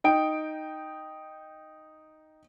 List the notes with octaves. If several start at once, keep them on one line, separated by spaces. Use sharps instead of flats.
D#4 G5 D7